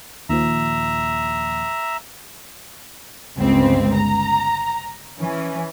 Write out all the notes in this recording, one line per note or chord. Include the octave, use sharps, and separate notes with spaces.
D#2 A#2 F3 E5 A#5
G1 C#2 C4
A#5
E3 C#4